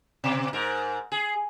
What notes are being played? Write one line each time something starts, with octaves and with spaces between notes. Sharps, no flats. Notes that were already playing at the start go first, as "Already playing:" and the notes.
B2
G#2 A#4
G#4